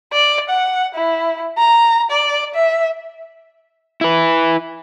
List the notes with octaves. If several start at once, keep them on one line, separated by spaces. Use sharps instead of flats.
D5
F#5
E4
A#5
D5
E5
E4 B4